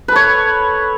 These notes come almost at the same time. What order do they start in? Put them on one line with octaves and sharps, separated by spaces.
B4 A4 C#5